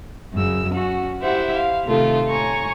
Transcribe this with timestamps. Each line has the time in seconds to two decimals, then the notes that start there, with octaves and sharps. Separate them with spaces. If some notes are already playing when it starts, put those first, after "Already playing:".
0.33 F#2 C#3 E6
0.73 C#4 F#4
1.22 E4 G4 C5 E5 F#5
1.54 F5
1.86 C3 D#3 A3 F4 A4
2.28 C#5 G#5 A#5 C#6